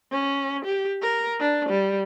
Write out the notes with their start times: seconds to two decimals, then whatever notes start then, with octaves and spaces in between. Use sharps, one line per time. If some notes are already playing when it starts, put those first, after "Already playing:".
0.12 C#4
0.65 G4
1.02 A#4
1.40 D4
1.69 G3